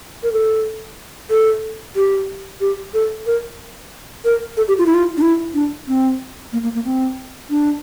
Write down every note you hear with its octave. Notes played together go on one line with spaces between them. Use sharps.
A#4
A4
A4
G4
G4
A4
A#4
A#4
A4
G4
F4
E4
F4
D4
E4
D4
C4
A#3
A#3
A#3
C4
D4